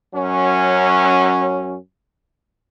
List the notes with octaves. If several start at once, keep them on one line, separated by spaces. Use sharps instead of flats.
F#2 F#3 C#4